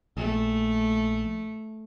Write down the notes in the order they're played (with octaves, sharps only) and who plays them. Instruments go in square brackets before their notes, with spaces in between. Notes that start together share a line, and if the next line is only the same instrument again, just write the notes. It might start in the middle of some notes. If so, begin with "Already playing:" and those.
[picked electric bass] A#1 [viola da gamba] A3